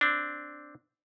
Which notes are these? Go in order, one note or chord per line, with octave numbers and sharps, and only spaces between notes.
C4 D4